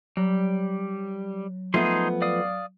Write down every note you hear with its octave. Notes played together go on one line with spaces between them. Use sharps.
F#3 G3
F3 A3 B3 D#4 G#4 C6
D5 F5 D#6